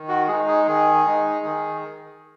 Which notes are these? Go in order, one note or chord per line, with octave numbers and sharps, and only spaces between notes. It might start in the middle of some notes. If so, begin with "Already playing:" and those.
Already playing: D#3
F#4
G#3 D#4 G#4
G#4
D#3 G#4
G#3 D#4
D#3